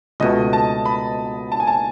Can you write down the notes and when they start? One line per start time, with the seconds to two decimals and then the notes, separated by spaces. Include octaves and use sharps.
0.20 C#2 B2 A3 D#5
0.53 A5
0.85 B5
1.52 A5
1.60 G#5
1.67 A5